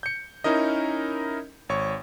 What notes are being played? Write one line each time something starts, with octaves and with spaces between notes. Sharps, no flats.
G6 C#7
C#4 D#4 E4 A#4 D#5
G#1 C#5 C#6